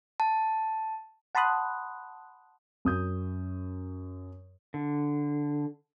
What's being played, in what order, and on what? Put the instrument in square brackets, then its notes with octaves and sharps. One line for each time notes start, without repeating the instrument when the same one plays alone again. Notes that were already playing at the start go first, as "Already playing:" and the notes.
[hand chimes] A5
[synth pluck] F#5 A5 B5 C6 D#6 F#6
[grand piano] F#2 D#6 G6
[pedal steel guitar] D3